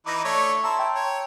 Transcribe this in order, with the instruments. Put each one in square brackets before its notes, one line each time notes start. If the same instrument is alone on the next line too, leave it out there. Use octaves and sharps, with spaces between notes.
[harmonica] E3 D#4 B4 [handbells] D6 A#6
[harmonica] A3 D4 C#5 [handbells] C#6
[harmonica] E4 E6 [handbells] A5 A#5 C6
[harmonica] E4 [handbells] G5
[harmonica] C#5